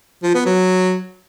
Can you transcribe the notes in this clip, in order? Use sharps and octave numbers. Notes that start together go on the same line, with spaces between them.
F3
B3
F#3